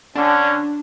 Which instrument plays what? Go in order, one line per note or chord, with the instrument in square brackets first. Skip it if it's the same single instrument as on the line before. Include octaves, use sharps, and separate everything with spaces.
[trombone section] D3 C#4 [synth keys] D4